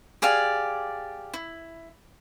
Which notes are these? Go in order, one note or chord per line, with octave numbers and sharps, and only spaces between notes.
G4 G#4 D5 F5
E4